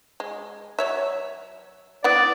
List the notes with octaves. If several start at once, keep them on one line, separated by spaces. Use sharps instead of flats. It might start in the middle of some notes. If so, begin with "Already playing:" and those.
G#3
F#3 C#5 E5
B3 E4 D5 F#5